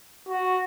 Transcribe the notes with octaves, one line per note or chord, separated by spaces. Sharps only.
F#4